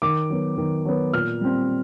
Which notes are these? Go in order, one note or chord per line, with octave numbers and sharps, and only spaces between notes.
D#3 D6
F#3 B3
D#3
F#3 B3
A#2 F6
G3 C4